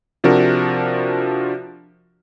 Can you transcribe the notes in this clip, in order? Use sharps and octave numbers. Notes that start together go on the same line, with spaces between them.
C3 F3 D4 F#4 A#4